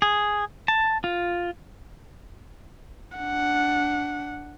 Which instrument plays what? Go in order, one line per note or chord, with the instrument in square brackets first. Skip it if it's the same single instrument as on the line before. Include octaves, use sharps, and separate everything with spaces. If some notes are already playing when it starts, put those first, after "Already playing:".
[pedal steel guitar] G#4
A5
F4
[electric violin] D4 F#5